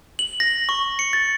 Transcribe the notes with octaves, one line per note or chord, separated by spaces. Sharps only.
F#7
A#6
C#6
C#7
A6